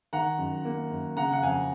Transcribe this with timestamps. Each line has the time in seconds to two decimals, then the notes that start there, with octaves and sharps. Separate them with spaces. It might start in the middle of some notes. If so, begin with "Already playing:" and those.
0.13 D#3 F#5 A#5
0.38 F#2
0.65 A#3
0.91 F#2
1.17 C#3 F#5 A#5
1.33 F#5
1.43 F2 F5 G#5